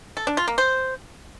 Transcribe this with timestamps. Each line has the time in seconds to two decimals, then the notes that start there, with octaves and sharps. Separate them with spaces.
0.17 A4
0.27 D4
0.37 F4
0.48 A#3
0.58 C5